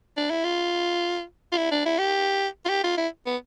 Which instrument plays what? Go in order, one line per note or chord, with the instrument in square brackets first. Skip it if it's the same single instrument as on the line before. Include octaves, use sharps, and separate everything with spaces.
[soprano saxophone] D4
E4
F4
F4
E4
D4
E4
G4
F4
G4
F4
E4
B3